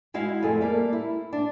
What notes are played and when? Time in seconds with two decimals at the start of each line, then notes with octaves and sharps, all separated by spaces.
0.14 G#3 E4 F#4 D#5 F5
0.43 F2 A3 G#4
0.61 G3 A3 A#3
0.93 E4
1.33 D4